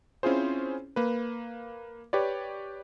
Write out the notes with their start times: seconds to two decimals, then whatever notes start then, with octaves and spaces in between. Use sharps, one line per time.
0.23 C4 C#4 E4 F4 G#4 C5
0.96 A#3 B4
2.13 G4 B4 C#5 D5